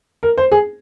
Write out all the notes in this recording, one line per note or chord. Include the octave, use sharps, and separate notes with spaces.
A#4
C5
G#4